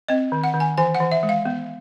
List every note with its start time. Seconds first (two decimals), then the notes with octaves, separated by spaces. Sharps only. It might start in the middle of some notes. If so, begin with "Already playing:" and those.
0.08 C4 D#5
0.32 D#3
0.44 F#5
0.54 D#3
0.60 G#5
0.78 E3 G#5
0.95 F#5
1.00 E3
1.12 E5
1.23 G#3
1.29 F5
1.45 B3